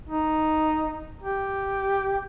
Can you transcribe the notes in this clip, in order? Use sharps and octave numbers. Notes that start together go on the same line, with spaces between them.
D#4
G4